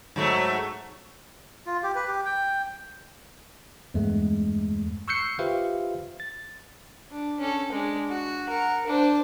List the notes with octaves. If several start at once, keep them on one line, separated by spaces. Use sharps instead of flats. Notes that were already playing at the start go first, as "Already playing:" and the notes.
G#2 F#3 A3
F4
G4
B4
G4
G5
E2 G2 G#3 A3
C#6 E6 F#6 G6 C7 C#7
F4 G4 B4 C5 E5 F5
A6
D4
C#4 A4
G#3 D4
F#4
A#4 F#5
D4 C5